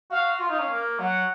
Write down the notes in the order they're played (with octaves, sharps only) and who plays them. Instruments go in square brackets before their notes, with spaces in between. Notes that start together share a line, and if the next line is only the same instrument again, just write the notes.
[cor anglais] F#4 [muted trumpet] F5
[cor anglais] F4 [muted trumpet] F5
[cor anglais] D#4
C#4
A#3
[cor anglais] F#3 [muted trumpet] F#5